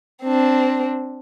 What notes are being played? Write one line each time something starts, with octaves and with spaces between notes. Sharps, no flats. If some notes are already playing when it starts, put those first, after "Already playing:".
C4 D4